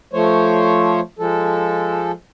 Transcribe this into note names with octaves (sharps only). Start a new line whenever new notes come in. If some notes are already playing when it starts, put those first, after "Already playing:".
F3 A3 C5 C#5
F3 G#3 A4